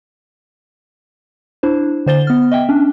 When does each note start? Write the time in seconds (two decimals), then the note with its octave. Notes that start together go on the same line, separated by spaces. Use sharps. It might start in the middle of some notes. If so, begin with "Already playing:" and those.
1.63 D4 E4 C5
2.06 D3 C5 A6 G7
2.27 B3 F6
2.51 D#5 E5 G5
2.69 C#4 D4